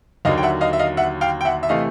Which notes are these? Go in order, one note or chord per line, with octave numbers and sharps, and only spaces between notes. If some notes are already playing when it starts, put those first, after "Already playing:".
D#2 D3 F#3 D#5 F5
G5
E5 F#5
D#5 F5
E5
D#5 F5
E5 F#5
F5 G5
G5
E5 F#5
E5
C3 E3 A3 D#5 F5